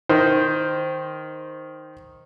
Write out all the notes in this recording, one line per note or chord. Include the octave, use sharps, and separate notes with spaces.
D#3 C5